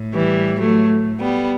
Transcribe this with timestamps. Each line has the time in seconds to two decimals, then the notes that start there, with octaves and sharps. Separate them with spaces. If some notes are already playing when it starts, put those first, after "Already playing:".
Already playing: A2
0.14 E3 G3
0.59 F#3 A3
1.20 G3 B3